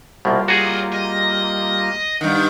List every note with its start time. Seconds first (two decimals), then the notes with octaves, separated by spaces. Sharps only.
0.25 C2 B2 G3 A#3 F4
0.48 F#4 G#4 D5 D#5
0.93 D#5
2.21 G2 D#3 F#5